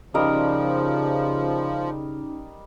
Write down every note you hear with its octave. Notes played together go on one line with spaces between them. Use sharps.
C#3 F3 G3 C#4 D#4 A#4 D#5